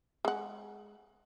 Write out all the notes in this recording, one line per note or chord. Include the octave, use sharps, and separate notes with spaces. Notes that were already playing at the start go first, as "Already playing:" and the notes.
G#3 F#5